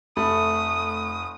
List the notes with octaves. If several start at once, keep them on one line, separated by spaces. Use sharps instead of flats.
F1 A3 B5 D#6